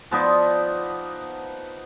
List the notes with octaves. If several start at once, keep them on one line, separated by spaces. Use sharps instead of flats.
F3 B3 D#4 D5